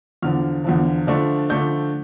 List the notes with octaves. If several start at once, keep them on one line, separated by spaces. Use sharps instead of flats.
E2 D3 F3 F6
E2 D3 F3
D3 F3 A3 D4
D3 F3 A3 D4 G6